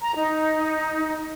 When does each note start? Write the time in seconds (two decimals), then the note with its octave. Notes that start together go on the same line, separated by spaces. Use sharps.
0.01 A#5
0.16 D#4